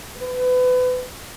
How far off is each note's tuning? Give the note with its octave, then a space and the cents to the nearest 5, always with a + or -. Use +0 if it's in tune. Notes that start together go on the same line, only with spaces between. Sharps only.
B4 +30